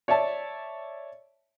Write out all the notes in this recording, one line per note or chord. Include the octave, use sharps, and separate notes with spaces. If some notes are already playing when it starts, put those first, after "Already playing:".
C#5 D5 E5 A5